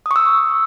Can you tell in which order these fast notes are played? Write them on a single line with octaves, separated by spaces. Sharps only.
D#6 C#6 E6